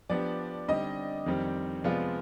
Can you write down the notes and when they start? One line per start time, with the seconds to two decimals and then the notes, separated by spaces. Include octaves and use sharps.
0.09 F3 B3 D4 G4 D5
0.68 D3 G3 C4 D#4 G4 D#5
1.26 F2 D#3 G3 C4 G4
1.84 C3 F3 G#3 B3 F4 D5